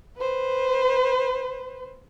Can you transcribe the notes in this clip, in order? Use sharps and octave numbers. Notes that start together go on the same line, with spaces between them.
B4 C5